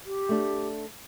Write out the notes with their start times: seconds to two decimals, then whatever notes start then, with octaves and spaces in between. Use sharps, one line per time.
0.06 G4
0.29 A3 D4